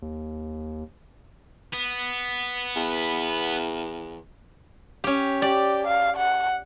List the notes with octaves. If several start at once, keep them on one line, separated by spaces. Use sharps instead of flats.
D#2
B3
E2
C#4 G4
G4 D5
F5
F#5